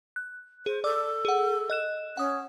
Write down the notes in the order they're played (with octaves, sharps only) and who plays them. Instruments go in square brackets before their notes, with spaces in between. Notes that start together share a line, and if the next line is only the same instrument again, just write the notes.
[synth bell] F#6
[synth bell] G#4 [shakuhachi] C5
[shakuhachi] A4 [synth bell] D5 D6 E6
[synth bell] G#4 F#5
D#5 F#6 E7
[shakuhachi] C#4 [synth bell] F#5 D#6